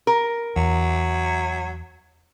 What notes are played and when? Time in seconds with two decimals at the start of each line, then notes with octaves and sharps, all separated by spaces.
0.07 A#4
0.56 E2 F#3